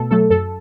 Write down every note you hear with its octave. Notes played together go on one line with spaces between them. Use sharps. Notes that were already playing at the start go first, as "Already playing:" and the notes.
Already playing: B2 A3 A4
F#3 A3 A4
F#2 A4